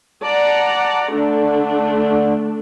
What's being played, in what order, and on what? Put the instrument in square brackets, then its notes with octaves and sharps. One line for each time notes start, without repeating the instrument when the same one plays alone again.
[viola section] D5 F#5 A#5 [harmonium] A5
[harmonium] D3 [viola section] A3 D4